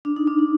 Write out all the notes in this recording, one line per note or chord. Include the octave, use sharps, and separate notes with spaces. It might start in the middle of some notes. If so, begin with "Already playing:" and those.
D4
D#4
D4
D#4